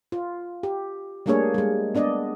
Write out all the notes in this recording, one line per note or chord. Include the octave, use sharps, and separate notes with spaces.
F4
G4
G3 A3 A#3 D4 G#4 C#5
G3 G#3
B3 D4 D5 D#5